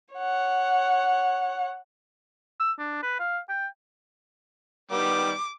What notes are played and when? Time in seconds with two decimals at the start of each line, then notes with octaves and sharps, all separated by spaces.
0.15 C#5 F#5
2.60 E6
2.79 D4
3.03 B4
3.20 F5
3.49 G5
4.91 D#3 G3 B3 D6